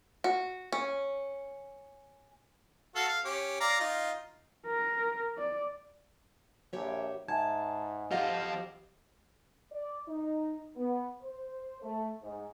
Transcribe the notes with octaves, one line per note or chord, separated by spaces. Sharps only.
F#4
C#4
F#4 A4 F5
F5
C#4 G4
D5 F5 A#5
D#4 F4
A#4
D5
A#1 G4 C#5 E5
G#2 E5 G#5 A5 G#6
F2 F4 G4 D#5 F5 F#5
D5
D#4
B3
C5
A3
G#2